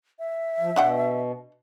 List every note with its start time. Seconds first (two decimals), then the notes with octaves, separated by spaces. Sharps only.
0.19 E5
0.60 F3
0.76 B2 D4 F#5 G5